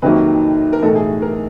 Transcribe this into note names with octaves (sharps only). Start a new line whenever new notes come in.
F2 C3 D#3 F#3 A#3 B4
A#4
B1 A2 E3 A4
G#4
A#4